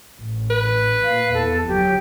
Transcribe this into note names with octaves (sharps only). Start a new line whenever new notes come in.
A1
B4
A#2 F5
E2 A4
G1 F#3 G4